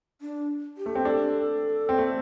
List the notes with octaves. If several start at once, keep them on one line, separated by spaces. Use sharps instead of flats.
D4
G4
A3
C4
D4 A4
C4
A3